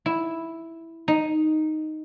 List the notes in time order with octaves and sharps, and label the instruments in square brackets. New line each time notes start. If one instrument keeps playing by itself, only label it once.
[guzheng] E4
D#4